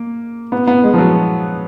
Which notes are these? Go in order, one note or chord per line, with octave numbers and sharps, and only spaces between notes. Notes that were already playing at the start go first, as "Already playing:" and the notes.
Already playing: A#3
B3
B3
G#3
F3
F#3